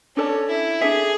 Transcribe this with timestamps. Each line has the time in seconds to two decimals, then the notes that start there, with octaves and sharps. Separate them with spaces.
0.16 C#4 D4 A4 D5 A5
0.49 E4
0.81 D4 G#4 A4 E5